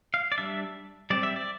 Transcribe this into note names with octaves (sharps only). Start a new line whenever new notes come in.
F5
D5
G3 D4 E5
G3 C4 D5
E5
D5